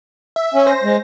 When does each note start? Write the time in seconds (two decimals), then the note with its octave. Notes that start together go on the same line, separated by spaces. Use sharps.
0.36 E5
0.54 C#4
0.66 C5 A#6
0.83 G#3